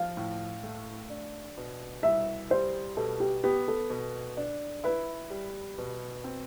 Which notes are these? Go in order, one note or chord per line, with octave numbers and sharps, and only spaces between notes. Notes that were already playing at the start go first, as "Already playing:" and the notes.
Already playing: F3 F5
A2
A3
D4
B2
C2 E5
G3 C5
B2 A4
G4
B3 G4
A4
B2
D4
E4 B4
G3
B2
C4